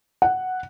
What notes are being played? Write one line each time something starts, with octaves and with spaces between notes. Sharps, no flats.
F#5